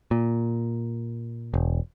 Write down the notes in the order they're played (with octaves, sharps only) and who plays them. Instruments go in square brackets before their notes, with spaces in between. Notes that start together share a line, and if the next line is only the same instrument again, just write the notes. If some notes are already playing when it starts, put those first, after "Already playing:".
[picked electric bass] A#2
E1